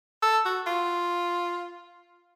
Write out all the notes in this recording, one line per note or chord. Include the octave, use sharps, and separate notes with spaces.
A4
F#4
F4